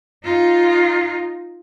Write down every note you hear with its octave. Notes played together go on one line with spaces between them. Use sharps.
D#4 F4